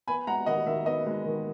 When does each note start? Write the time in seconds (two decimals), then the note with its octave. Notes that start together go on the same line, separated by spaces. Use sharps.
0.08 B3 G#5 B5
0.27 G#3 F#5 A#5
0.46 D#3 D#5 F#5
0.66 D#3 E5
0.86 B3 D#5
1.06 G#3
1.26 D#3